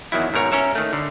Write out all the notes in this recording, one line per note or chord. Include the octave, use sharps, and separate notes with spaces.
E2 D#3 F#3 E4
G#2 B2 A#4 C#5
C#4 A#4 C#5 E5
D#3 A3
D3